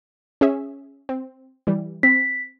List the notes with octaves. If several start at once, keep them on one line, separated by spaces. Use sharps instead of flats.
C#4 G#4 E5
C4
E3 G3
C4 B6